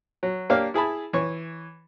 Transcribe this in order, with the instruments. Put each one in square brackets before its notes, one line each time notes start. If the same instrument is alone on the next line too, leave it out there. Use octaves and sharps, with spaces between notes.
[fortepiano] F#3
A#3 D4 G4 C#5 F5
E4 G#4 A5 B5
E3 C#5 C#6